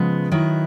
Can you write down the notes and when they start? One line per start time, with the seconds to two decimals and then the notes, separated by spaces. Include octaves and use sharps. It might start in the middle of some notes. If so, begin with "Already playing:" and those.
Already playing: C#3 F3 G#3 B3
0.32 D#3 F#3 B3 E4